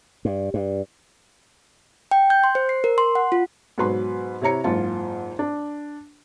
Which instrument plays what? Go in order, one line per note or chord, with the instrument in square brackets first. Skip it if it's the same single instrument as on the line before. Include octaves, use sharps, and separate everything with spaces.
[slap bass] G2
G2
[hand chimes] G5
G6
C6
C5
C7
A#4
C6
F#5
F4
[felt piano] G#2 B2 F#3 B4 B5 C6
C3 E4 C#5 A#5 C#7
F#1 G#2 F4 A5
D4